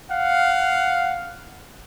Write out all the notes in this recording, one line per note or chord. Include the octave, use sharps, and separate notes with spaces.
F5 F#5